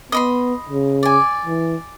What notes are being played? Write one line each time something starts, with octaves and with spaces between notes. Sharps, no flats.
B3 D#5 B5 C6
C#3
D5 G#5
E3